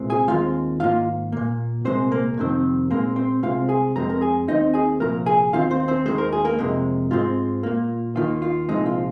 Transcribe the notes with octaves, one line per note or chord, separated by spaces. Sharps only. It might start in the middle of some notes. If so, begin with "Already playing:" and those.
Already playing: C2 A#2 G#3 C4
G#4 G#5
D#2 D#3 G#3 C4 F4 F5
G#2 D#3 A#3 F4 F5
A#2 A#3
C2 A#2 G#3 C4 C5
A#3 A#4
F2 C3 D#3 C4
A#2 G#3 A#3 C4 A#4
C4 C5
C2 C3 G#3 C4 F4 F5
G#4 G#5
F2 C3 G#3 C4 A#5
A#4 A#5
G#4 G#5
D#2 D#3 C4 D#4 D#5
G#4 G#5
C2 A#2 F3 A#4 A#5
G#4 G#5
D#2 D#3 C4 F4 F5
C4 C5
C4 C5
D#2 D#3 G#3 C5
A#4
G#4
A#3 A#4
F2 C3 G#3
G#2 G#3 C4 F4
A#2 A#3
D#2 D#3 A#3 F4
F4
C2 A#2 F3 G#3 C4 D#4
F4